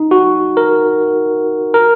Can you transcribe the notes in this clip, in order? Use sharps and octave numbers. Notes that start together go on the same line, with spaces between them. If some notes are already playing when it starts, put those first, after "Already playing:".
Already playing: D#4
F#4
A#4
A#4